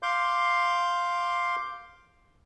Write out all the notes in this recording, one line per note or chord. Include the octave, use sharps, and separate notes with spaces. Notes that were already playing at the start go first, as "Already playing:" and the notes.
F5 C6 D6 G6